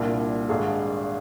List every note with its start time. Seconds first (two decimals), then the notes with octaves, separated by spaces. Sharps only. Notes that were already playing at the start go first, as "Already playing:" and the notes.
Already playing: C2 A#2 G3 D4
0.49 G#1 G#2 G3 D4 G#4